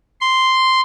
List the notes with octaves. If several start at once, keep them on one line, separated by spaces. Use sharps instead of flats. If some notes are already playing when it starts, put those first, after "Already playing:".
C6